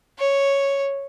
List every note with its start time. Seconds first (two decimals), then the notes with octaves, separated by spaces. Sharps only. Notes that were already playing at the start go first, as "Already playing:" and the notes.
0.19 C#5